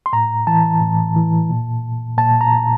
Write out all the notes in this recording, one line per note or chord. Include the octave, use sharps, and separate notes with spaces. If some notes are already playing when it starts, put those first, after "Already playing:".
C6
A2 A#5
E3 A5
A2
E3
A#2
A#2 A5
A#5